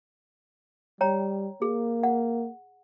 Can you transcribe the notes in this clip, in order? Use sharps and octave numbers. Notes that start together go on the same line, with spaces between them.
G3 C#5 G5 A#5
A#3 G#4
F#5